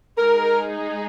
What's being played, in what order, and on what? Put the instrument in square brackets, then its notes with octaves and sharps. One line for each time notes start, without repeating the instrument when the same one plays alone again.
[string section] G#3 D#4 G#4 [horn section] A#4